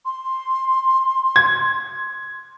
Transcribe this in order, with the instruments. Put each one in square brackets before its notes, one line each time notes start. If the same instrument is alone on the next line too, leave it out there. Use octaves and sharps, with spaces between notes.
[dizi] C6
[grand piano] G#6